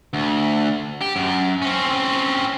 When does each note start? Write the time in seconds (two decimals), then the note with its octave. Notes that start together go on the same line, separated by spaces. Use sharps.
0.13 D2
1.01 G4
1.16 F#2
1.62 C4 C#4